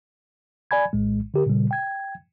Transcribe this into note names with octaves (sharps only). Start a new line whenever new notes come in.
D5 G#5 B5 G#6
A#1 A2 G#3
D3 G4 A#4
A#2 C#3 G3
G5 G#6